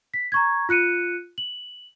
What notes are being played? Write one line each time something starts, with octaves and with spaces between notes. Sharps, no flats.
B6
A#5 C#6 G#6
F4 F#6 C#7 D#7
F#7